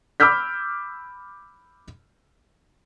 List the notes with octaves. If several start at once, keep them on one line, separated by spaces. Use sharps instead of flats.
B5 D6 E6 F6 G6 B6